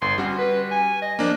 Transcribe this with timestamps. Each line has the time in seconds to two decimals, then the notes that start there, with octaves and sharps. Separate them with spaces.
0.02 G1 C6
0.18 G3 C#4 F#4
0.38 B4
0.71 G#5
1.02 D#5
1.19 F3 A#3 D4